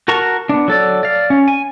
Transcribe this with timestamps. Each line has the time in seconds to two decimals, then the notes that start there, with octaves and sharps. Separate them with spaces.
0.08 F#4 A#4 A5 A#5 C#6
0.49 B3 D4
0.68 F#3 A4 D5
1.03 D5 F5
1.30 C#4
1.48 G#5